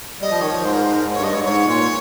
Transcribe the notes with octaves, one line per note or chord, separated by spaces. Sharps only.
G3 D#5
F3
D#3 C#5
F3
G#2 C5
A#4
C5
A#4
G#2
G2 C#5
D#5
G#2 C#5
G#2 C#5
A#2